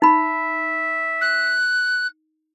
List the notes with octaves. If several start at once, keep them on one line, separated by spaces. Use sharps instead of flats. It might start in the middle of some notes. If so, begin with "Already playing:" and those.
D#4 E5 B5
F#6